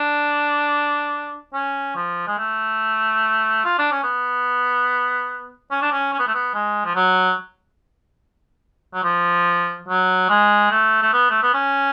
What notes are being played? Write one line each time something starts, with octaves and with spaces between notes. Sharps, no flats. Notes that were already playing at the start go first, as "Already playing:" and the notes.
Already playing: D4
C#4
F3
G#3
A3
F4
D4
C#4
B3
C#4
D4
C#4
C#4
B3
A3
B3
G#3
F3
F#3
F#3
F3
F#3
G#3
A3
A3
B3
A3
B3
C#4